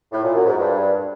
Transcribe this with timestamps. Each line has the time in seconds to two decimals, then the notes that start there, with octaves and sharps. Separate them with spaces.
0.12 A2
0.24 A#2
0.35 F#2
0.46 G#2
0.58 G2